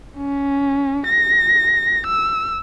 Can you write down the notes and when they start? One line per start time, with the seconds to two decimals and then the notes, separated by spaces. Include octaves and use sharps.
0.17 C#4
1.07 A#6
2.07 E6